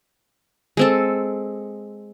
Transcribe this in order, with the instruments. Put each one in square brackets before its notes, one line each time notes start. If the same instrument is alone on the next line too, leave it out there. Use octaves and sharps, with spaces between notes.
[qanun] G#3 C4 A4